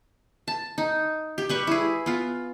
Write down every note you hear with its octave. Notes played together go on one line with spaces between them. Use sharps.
A5
D#4
G4
G3 B4 C#6
E4 G#4
B3 F4